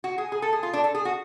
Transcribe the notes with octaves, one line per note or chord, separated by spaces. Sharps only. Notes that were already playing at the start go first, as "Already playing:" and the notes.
F#4
G#4
G#4
A4
G#4
F4
D4
A4
G#4
F#4